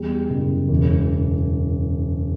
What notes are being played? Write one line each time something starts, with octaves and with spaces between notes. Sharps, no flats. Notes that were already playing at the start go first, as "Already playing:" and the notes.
Already playing: E2 G3
F#1
E1